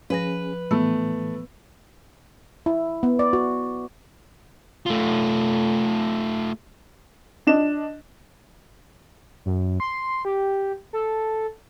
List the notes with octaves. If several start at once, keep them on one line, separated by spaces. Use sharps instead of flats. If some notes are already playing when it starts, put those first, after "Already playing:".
F3 C#4 G#4 B4 A#6
A2 E3 A3 B3
E4
B3
D5
F#4
A3 F4
D4 D#5 E7
F#2
C6
G4
A4